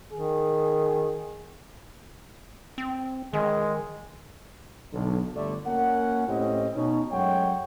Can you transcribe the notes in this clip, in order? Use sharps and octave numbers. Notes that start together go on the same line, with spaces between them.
D#3 G#4
C4
D#3 G#3
B1 D3
G1 D3 G3 A3 D5
A#3 C#4 F#4 A#4 F#5
A2 C4 C#4 E4 G4 D#5
B2 C#4 D#4
F#2 G#3 A3 C#5 F#5 G5